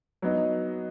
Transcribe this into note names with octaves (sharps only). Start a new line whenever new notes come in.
F#3 B3 D#4